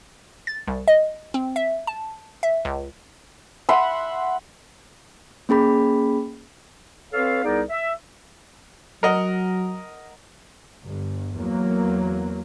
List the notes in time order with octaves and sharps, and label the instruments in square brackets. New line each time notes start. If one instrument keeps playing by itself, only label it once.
[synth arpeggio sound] A6
C2
D#5
C4
E5
A5
E5
C#2
[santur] E5 F#5 B5 C6
[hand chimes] A#3 C#4 G#4 B5
[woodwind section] C4 A4 B4 C#5 F5
C2 B3 D#4 G#4 A#4 D5
E5
[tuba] F#3 [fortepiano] A#4 D#5 F#5
[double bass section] G1
E2 F#3 A#3